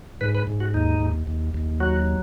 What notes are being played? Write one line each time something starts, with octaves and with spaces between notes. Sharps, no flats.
G#2 B4
B4
G#2
F#4
D#2 D#4
D#2
D#2
D#2
F#3 F#4